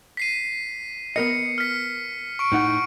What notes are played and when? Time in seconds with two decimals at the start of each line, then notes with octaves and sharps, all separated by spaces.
0.17 B6 C7 D#7
1.16 B3 A#4 D#5 C#7
1.58 F6 B6
2.39 C#6 D7
2.52 A2 D#4 F#5